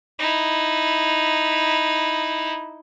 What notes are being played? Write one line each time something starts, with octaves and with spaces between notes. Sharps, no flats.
D#4 E4